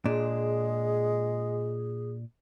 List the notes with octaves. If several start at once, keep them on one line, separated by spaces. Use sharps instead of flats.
A#2 G#3 D4 G#4